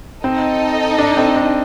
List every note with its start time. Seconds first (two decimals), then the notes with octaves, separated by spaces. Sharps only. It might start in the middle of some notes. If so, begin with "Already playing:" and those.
0.24 C4 D#4 A4 D#5
0.98 D4
1.17 C4
1.36 D4